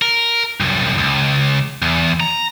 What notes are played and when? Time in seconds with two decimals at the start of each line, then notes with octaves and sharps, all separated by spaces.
0.02 A#4
0.60 C2 F#2
0.98 C#2
1.82 E2
2.20 A#5